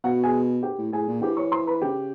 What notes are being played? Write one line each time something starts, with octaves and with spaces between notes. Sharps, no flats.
B2 F#4 F#5
G#4 G#5
G4 G5
A2
A2 G#4 G#5
A#2
E3 G4 G5
C#5 C#6
C5 C6
B4 B5
C#3 G4 G5